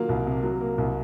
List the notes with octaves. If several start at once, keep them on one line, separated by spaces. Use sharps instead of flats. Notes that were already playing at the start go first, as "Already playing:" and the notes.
Already playing: D#3 F#3 A#3 F4 F5
C2
C3
F#3
A#3
C2